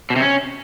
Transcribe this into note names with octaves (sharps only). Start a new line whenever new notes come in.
B2
C3
C#4